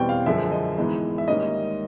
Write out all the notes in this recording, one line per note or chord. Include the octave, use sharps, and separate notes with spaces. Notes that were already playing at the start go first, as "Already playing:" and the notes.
Already playing: E2 B2 G3 C4 G5 C#6
F5
F#2 D3 F3 G#3 E5
D#5
G#2 E3 G#3 B3 D#4
E5
G#2 D#3 G3 A#3 C#4 D#5